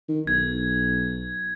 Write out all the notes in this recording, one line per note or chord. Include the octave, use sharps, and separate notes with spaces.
D#3
B1 G#6